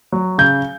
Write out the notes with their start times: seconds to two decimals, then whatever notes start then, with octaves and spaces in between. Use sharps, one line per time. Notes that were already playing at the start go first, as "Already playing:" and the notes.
0.12 F#3
0.38 C#3 G6